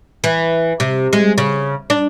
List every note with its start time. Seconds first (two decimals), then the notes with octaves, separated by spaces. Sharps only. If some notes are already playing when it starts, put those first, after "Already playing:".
0.24 E3
0.80 C3
1.13 G#3
1.38 C#3
1.90 D4